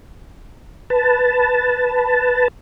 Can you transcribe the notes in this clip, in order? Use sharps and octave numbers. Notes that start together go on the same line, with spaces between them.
B4 A5